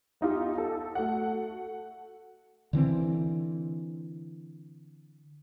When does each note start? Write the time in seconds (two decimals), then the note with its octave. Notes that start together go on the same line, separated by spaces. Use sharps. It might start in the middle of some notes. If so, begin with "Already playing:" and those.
0.21 B3 D#4 F4 G4
0.58 A4
0.95 A3 F#4 A4 F#5
2.73 D3 E3 C4